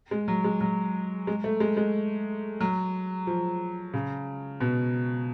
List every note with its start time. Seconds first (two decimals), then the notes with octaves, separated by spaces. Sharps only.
0.11 G#3
0.28 F#3
0.44 G#3
0.61 F#3
1.27 G#3
1.44 A3
1.60 G#3
1.77 G#3
2.60 F#3
3.27 F3
3.94 C#3
4.60 B2